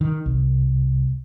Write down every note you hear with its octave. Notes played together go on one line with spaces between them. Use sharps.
D#3
C2